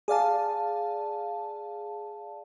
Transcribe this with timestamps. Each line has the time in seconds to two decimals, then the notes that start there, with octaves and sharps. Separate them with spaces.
0.08 G#4 D5 F5 A5